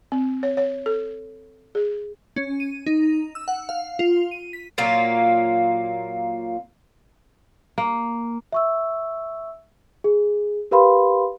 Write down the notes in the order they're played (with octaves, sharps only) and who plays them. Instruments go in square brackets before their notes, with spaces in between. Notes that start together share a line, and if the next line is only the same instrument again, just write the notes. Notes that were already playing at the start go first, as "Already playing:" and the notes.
[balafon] C4
C#5
C#5
A4
G#4
[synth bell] C#4
D#7
D#4
E6
F#5
F5
F4
D#7
B6
[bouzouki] A#2 F#3 A#3 F4
[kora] A#3
[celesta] E5 C#6 E6
G#4
G4 A#4 B4 F5 B5 C6